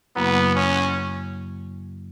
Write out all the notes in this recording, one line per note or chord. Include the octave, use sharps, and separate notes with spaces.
F#2 C#3 F#3 A#3 B3 E4
C#4